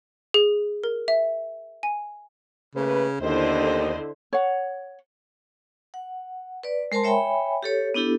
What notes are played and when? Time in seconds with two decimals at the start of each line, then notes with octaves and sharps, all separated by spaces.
0.34 G#4
0.84 A#4
1.08 E5
1.83 G#5
2.75 C#3 A3 A#3 B4
3.21 D#2 D3 B3 D4 E4 C5 D#5
4.33 C#5 F#5
5.94 F#5
6.63 B4 D5
6.92 G#3 A#4 C5 A5 C6
7.04 C#5 E5 G5 G#5 B5
7.63 G4 A4 C#5
7.94 B3 D4 E4 G4 A4